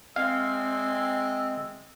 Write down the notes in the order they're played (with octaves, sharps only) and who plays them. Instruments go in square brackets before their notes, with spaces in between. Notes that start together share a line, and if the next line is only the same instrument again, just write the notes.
[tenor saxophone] G#3 [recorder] C4 [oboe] E5 [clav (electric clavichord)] F5